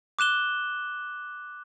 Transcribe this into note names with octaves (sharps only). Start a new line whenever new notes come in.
D6 F#6 E7 G7